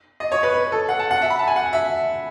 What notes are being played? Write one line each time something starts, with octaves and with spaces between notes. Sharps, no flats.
D#5
C#5
B4
B4
A4
F#5
A5
F#5
E5
B5
A5
G#5
F#5
E5